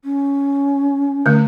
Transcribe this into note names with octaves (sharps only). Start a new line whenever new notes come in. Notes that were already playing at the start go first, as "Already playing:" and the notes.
C#4
D3 A3